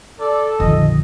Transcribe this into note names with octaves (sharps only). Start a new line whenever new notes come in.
A4 D5
A#1 F2 D3 D#3 F3 D#5